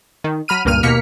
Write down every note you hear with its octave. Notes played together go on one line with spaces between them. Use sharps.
D#3
F#3 B5 F6 D#7
C#2 G2 A#2 F6 D#7
D#2 B2 A#3 F6 B6 C#7